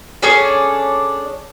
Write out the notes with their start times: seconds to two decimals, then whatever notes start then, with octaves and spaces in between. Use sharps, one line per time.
0.22 C#4 D4 G#4 A4